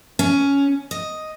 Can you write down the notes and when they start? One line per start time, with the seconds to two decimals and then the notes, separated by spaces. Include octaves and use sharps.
0.19 C#4
0.91 D#5